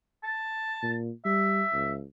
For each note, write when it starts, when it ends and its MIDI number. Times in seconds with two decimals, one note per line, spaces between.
0.24 0.92 81
0.83 1.10 46
1.25 1.62 55
1.25 1.94 76
1.73 2.03 37